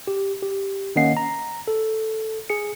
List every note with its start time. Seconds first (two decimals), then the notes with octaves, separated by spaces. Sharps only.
0.07 G4
0.42 G4
0.96 D#3 A#3 C#4 D#5 F#5 C7
1.17 A#5
1.68 A4
2.50 G#4 C#7